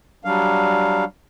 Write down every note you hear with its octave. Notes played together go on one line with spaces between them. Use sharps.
F#3 G3 D4 F5